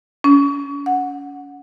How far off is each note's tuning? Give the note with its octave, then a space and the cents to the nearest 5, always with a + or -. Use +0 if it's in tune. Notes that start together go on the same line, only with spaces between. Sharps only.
C#4 +35
F#5 -10